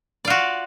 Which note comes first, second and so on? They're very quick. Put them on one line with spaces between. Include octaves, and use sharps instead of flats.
D5 F4 F#4